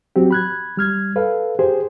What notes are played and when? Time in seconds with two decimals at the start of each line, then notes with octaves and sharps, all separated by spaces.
0.16 F#3 C4 F#4 G4
0.31 B5 F#6 G#6
0.77 G3 F6 G#6
1.16 A4 B4 F5
1.59 G4 G#4 C5